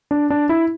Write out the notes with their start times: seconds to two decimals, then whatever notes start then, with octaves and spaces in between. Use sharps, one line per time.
0.11 D4
0.30 D4
0.49 E4